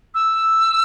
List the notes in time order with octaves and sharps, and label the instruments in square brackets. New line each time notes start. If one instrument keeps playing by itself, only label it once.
[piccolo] E6